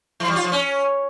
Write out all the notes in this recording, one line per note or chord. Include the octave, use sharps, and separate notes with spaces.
E3
G3
F4
F3
C#4